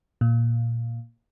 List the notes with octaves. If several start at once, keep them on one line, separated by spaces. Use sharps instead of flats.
A#2